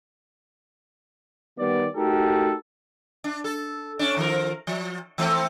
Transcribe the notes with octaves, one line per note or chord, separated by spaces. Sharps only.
D#3 G3 B3 D5
A3 D#4 F#4 G4 A4 A#4
D4
A4
C#4 D4
D#3 F3 A#4
F3
E3 A3 C4